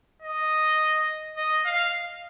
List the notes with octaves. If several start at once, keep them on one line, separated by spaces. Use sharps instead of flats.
D#5
D#5
F5